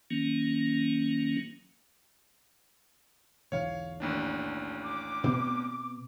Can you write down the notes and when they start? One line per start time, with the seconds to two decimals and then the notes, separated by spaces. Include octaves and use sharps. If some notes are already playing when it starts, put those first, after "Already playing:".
0.10 D#3 F#3 A#3 C#4
3.52 B1 E2 C#5 F5
4.00 A1 D#2 D4
4.82 D6
5.24 B2 B3 C4